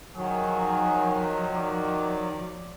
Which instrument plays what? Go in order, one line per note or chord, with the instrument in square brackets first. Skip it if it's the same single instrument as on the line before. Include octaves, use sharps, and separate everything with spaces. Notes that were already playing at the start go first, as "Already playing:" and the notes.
[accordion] D#3 F#3 [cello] F3 [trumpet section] F#4 G#4
[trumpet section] D5